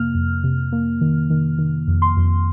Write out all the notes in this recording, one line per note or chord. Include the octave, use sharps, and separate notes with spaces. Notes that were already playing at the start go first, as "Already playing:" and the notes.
Already playing: F2 C3 A#3 F6
F2
C3
A#3
D#3
D#3
D#3
F2
C6
F2